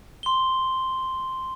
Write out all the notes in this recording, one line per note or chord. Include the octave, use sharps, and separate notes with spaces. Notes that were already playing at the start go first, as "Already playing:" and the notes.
C6 G7